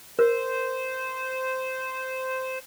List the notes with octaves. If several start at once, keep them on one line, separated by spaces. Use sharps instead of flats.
A#4 C5